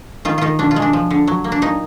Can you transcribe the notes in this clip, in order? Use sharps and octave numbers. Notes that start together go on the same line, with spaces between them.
D#3 F4
D#3 D#4 F4
B2 D4
F4
G#3
D4
F3
D3
F#3
A#3
D4
A#2 D#4